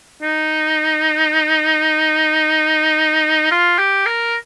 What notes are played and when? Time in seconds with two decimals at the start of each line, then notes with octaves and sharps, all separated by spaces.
0.22 D#4
3.51 F4
3.79 G4
4.06 A#4